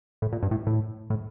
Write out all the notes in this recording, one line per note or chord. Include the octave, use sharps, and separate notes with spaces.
A2
A#2
G2
A2
A2
A2